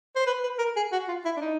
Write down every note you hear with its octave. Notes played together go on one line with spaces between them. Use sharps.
C5
B4
B4
A#4
G#4
F#4
F4
E4
D4
D#4